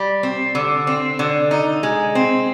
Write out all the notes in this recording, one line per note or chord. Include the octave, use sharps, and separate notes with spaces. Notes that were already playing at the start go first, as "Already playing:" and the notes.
Already playing: G3
C4
D3
C4
D3
D#4
G#3
C4